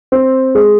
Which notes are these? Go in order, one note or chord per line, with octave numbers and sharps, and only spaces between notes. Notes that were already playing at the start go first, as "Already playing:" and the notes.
C4
G#3